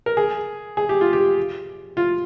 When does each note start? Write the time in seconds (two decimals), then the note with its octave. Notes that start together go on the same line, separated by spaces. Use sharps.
0.06 A#4
0.17 G#4
0.77 G#4
0.89 G4
1.01 F4
1.13 G4
1.97 F4